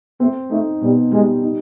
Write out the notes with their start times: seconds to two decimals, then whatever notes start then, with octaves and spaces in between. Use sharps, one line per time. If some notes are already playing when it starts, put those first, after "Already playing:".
0.20 A3 C4
0.50 A3 D#4
0.81 B2 G3
1.12 G3 G#3
1.43 D#4